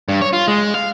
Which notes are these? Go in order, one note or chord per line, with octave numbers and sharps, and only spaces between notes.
G2
C#5
F4
G#3
F5